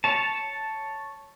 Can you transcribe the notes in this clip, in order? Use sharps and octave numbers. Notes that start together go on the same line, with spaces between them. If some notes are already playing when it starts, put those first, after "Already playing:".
C#5 A5